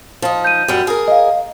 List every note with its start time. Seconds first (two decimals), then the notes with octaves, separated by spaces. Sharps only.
0.22 F3 D#4
0.44 G6 D#7
0.68 F#2 G3
0.87 G#4 A#4
1.08 D#5 F5